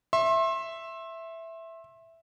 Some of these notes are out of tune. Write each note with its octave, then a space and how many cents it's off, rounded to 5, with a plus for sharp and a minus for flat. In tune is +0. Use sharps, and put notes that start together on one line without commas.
E5 +0 C6 +35